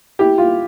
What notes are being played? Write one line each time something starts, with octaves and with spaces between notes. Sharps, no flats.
E4 G4
F4